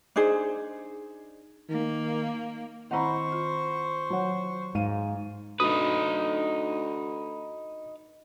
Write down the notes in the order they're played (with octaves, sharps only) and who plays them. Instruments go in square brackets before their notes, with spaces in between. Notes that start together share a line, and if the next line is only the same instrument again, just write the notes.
[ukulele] D4 D#4 G#4 C5
[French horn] D#3 [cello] A#3
[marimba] D#3 C4 E4 [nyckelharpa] C5 C#6 [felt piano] F#5 A#5 B5
[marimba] F4
[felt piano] F#3 C#5 F#5
[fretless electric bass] G#2 [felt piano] F5 D#7
[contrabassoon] D2 [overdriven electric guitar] D#4 B4 [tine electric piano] D#6